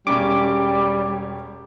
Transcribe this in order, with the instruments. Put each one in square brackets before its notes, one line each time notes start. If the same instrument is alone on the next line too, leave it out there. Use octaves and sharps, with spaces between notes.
[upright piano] E1 C#4 [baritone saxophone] G3 [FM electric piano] D6